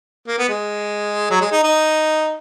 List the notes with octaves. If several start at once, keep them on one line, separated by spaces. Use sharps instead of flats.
A#3
B3
G#3
F#3
G#3
D#4
D#4